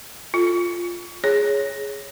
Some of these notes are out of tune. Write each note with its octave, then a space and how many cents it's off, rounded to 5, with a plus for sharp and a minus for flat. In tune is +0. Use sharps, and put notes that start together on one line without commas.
F4 +0 A4 +0
G#4 +0 C#5 +0